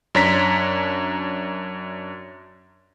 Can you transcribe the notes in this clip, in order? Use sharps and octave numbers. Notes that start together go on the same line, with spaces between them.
F#2 D4 C#5 A#5 B6